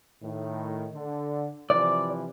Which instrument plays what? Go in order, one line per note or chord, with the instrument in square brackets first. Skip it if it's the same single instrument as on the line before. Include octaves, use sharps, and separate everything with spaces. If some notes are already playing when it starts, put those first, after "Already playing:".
[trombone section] A2 D#3
D3
[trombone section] C3 E3 F3 [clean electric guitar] D5